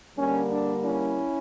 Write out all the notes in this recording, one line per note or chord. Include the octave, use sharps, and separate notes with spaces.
D3 G3 A#3 C#4
D4
C#4 E4